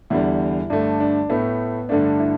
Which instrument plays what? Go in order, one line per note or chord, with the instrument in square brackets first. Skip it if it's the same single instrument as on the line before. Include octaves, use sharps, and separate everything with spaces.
[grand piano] E2 D3 G3 E4
G2 D3 A3 D4
D4
A2 A3 B3
G2 D3 A3 D4
E4